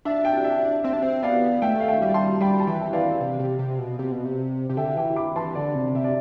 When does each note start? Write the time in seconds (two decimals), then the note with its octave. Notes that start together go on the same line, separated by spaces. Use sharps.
0.05 D4 E5
0.24 E5 G5
0.44 E5
0.84 C4 E5
0.93 D4
1.03 C4
1.23 B3 D5 F5
1.62 A3 E5 G5
1.80 F5
1.88 E5 G5
2.02 G3
2.14 A5 C6
2.41 G3 G5 B5
2.59 A5
2.67 E3 E5 G5
2.93 E3 D5 F5
3.20 C3
3.39 C3
3.59 C3
3.78 B2
3.99 C3
4.12 B2
4.25 C3
4.70 C3
4.77 D3 E5 G5
4.96 E3 E5 G5
5.16 B5 D6
5.36 E3 A5 C6
5.55 D3 D5
5.75 C3
5.95 C3 E5
6.04 D5